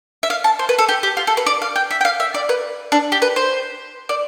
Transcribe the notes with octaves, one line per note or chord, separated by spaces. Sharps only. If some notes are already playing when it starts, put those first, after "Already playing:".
E5
F5
A5
C5
B4
A4
G4
G4
F4
A4
B4
D5
F5
G5
E5
G5
F5
E5
D5
B4
D4
G4
B4
C5
D5